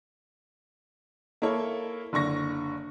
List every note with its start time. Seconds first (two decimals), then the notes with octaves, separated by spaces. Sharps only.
1.42 A#3 E4 A4 C#5
2.13 F#1 D3 C#6 A#6